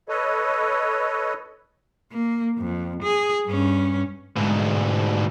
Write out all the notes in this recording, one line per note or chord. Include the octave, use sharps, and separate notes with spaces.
A4 B4 C#5 D#5
A#3
F2
G#4
G2 C#4
D2 G#2 B2